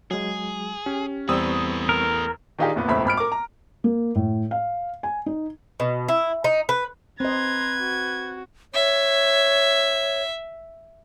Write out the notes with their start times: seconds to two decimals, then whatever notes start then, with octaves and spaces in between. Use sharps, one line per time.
0.11 F#3 G#3 G#4
0.86 C#4 G4
1.29 E2 G3 A3 C4 B4 C#6 D#6 E6
1.89 A#4
2.59 D#3 D4 D#4 F4 G4 G#4
2.76 F1 A#2 B3
2.88 E1 C#2 A2 F3 E5 B5
3.05 G#1 B5 F6 D7
3.17 A#4 D6
3.32 A#5
3.84 A#3
4.15 A2
4.51 F5
5.03 G#5
5.26 D#4
5.80 B2
6.08 E4
6.44 D#4
6.69 B4
7.20 C4 B4 D#5 A#5 C6 G#6
7.79 F#4
8.74 C#5 E5